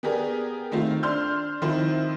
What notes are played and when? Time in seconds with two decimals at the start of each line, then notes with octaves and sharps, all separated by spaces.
0.03 B3 G4 G#4 A#4 D5
0.72 D#3 A3 C4 F4
1.03 D4 C6 F6 G6
1.62 D#3 F3 C4 E4 C5